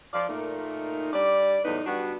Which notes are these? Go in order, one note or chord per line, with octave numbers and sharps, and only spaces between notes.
F3 F4 D5
A#2 A3 A#3 D#4
G3 D4 D5
E2 A2 F#3 D#4 B4
G3 B3 D4 F#4